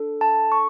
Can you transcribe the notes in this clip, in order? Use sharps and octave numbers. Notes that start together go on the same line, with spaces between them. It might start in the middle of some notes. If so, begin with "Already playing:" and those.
Already playing: D4 A4
A5
C#6